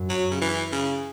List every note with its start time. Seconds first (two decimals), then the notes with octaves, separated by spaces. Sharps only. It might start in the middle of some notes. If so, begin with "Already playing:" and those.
Already playing: F#2
0.09 F#3
0.31 C#3
0.41 E3
0.72 C#3